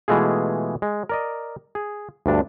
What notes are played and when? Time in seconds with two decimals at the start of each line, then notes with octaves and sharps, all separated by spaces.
0.08 B2 E3 G#3 A3 F4 G#4
0.82 G#3
1.09 A#4 D5 D#5
1.75 G#4
2.26 D2 G2 D4